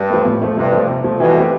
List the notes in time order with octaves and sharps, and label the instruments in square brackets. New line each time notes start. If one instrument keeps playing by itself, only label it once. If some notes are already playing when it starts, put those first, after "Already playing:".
Already playing: [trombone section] G2
[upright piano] F3 A3
A2
F3 A3
[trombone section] G2 [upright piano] C3
[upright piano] F3 A3
C3
F3 A3
[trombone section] G2 B2 [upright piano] E3
[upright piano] A3 C4 G4